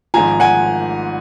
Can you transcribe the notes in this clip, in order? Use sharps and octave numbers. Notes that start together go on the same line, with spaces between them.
G#1 G#2 F3 G#5 A#5
F#5 G#5